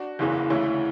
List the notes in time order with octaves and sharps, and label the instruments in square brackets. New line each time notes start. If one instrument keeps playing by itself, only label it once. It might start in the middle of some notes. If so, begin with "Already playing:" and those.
Already playing: [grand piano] D4 F#4
F#1 E2 C#3 E3
D2 C#3 E3 C#4 E4